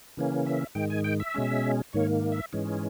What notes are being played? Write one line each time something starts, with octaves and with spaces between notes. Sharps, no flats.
C#3 E3 A#3 C#4
E5
G#2 D#3 G#3 G5
G#5
G5
E5
B2 G#3 C#4
G#2 D#3 A#3 C#5
E5
G#2 E3 G#3 C#4